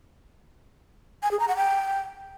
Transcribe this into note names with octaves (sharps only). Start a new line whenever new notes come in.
G#5
G#4
A#5
F#5
G5